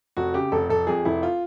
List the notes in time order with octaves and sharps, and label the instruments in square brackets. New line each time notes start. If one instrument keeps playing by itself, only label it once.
[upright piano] F1 F#4
C#3 G4
F1 A4
F1 A4
F2 G#4
F1 E4
F4